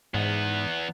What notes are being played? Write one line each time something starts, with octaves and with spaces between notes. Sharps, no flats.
E2 G#2 B3